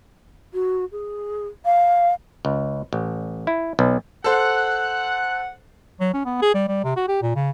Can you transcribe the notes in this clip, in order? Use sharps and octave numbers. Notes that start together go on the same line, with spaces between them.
F#4
G#4
F5
C#2
A1
E4
B1
A4 C5 F#5 F#6
F#3
C#4
B3
G#4
G3
G3
C3
F#4
G4
A#2
C#3